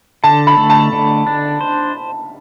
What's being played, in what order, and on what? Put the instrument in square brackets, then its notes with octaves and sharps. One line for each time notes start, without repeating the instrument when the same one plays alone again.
[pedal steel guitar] D3 [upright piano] A5
[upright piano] B5
[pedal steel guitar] A3
[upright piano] A5
[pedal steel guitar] D3
D4
C5